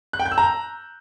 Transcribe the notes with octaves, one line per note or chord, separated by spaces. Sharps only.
F#6
G5
G6
E6
A#5